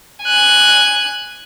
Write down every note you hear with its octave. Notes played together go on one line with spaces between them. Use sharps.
G#5 F#6